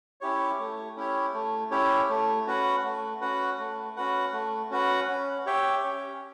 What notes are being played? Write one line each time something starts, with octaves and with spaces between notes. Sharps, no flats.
C#4 E4 G4 C#5
A3
C#4 E4 G4 C#5
A3
C#4 E4 G4 C#5
A3
C#4 F#4 B4 F#5
A3
C#4 F#4 B4 F#5
A3
C#4 F#4 B4 F#5
A3
C#4 F#4 B4 F#5
C#4
G4 C#5 E5 G5
C#4